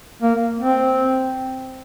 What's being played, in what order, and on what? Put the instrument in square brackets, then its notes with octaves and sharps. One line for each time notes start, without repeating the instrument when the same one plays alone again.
[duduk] A#3
C4